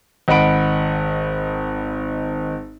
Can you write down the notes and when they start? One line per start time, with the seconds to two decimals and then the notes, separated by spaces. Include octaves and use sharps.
0.28 G#1 D#5 F#5 B5 D7